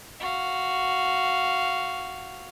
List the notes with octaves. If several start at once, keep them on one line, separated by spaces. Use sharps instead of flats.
F#4 F5